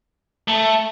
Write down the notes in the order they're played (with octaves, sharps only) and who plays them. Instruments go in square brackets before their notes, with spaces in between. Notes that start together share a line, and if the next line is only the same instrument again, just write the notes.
[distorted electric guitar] A3